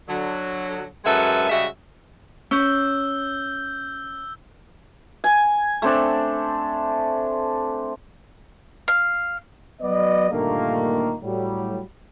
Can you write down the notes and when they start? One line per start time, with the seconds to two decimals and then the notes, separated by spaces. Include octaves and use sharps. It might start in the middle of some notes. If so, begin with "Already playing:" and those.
0.09 D3 F#3
1.05 F#2 G#3 F#4 A4 B4 E5
1.49 C#3 G3 G#3 F#4 E5
2.51 C#4 E6 G6
5.24 G#5
5.82 A3 C4 D4
8.88 F5
9.81 F#3 B3 D5 D#5
10.30 G2 A#2 D3 D#3 A3 A#3
11.23 A2 F#3 G3